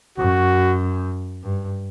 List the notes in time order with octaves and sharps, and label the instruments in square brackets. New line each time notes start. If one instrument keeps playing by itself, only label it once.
[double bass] F#2 [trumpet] F#4
[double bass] G2